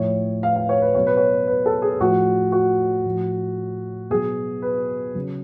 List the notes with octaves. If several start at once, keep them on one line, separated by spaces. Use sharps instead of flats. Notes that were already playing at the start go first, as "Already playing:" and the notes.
Already playing: A2 F3 C#5
F5
F5
C#5
B4
B2 F#3 C#5
B4
C#5
B4
A4
G#4
A2 F3 F#4
F#4
A2 F3
B2 F#3 G#4
B4
C#3 F#3